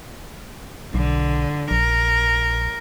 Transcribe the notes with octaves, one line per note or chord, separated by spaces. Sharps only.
B1 D3
A#1 A#4